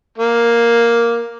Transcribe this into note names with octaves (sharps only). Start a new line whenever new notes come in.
A#3